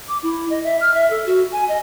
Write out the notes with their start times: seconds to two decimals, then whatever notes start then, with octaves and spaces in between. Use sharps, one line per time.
0.08 D6
0.22 E4
0.50 D#5
0.64 E5
0.81 F6
0.94 E5
1.11 A4
1.26 F#4
1.52 G#5
1.69 D#5